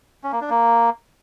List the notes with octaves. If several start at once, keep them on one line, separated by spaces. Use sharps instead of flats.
C#4
A#3
D4
A#3